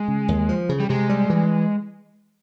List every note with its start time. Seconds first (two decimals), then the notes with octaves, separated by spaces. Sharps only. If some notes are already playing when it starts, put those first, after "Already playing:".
Already playing: G#3
0.08 C#3
0.28 D#2
0.49 F3
0.69 C#3
0.80 G3
0.90 C3 G#3
1.09 G3
1.30 E3